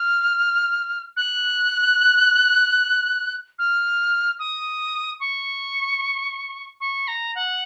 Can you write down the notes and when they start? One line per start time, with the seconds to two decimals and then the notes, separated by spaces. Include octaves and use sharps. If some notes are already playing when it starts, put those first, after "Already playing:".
Already playing: F6
1.16 F#6
3.59 F6
4.39 D#6
5.20 C#6
6.80 C#6
7.08 A#5
7.35 F#5